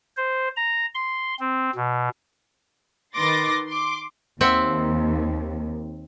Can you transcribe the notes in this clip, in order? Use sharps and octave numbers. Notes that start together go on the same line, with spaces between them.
C5
A#5
C6
C4
B2
D#3 B4 C6 D6 A6 A#6
C6 D6
D#2 C4 E5 F#5